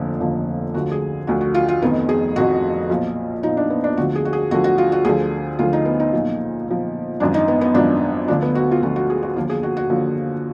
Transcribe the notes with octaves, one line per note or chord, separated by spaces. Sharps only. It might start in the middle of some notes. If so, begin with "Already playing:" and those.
Already playing: F1 D#2 D3 F3
F1 D#2 D3 F3
D2 D3 F3 F#4
G#4
D2 D3 F3 F#4
F#4
F4
F4
F1 F2 D#3 B3
G#4
F1 F2 D#3 F#4
B1 A#2 F3
B1 A#2 F3 D#4
D4
B3
D4
D2 D3 F3 F#4
G#4
F#4
G#4
D2 D3 F3 F#4
F#4
F4
F#4
D2 D3 F3 G#4
D2 D3 F3 F4
D#4
B3
D#4
B1 A#2 F3
B1 A#2 F3
G#1 F#2 F3 D4
D#4
B3
B3
G#1 F#2 F3 D4
D2 D3 F3 D4
B3
F#4
F4
D2 D3 F3 F#4
F#4
G#4
F#4
D#2 D3 F3 F4
G#4
F#4
F#4
D#2 D3 F3